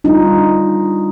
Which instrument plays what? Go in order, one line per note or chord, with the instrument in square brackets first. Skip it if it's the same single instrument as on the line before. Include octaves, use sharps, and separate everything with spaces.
[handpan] G3 D4 D#4 F4